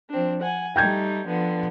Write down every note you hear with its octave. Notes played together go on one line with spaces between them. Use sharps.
F3 C4 D4
F#5 G#5
G3 A3 D#4 G5 G6 G#6
D3 F3 B3